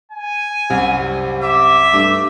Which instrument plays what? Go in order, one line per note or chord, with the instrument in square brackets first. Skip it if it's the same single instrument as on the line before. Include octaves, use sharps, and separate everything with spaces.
[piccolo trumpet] G#5
[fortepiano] C2 F#2 [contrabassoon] C3
[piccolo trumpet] E5 [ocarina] D6
[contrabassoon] G2 [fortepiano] A3